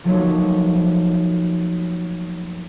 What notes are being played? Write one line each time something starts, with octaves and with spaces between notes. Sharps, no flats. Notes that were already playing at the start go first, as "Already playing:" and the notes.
F3 F#3 A3 A#3 D#4 C#5